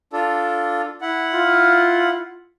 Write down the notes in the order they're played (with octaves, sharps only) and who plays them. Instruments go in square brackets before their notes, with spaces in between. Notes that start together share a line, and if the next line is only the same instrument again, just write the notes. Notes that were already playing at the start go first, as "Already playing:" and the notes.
[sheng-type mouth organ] D4 F4 A4
E4 F#5
[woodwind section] F4